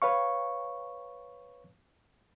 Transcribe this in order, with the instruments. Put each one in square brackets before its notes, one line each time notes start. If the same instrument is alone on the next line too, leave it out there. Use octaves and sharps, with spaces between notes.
[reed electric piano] B4 C#5 F5 C#6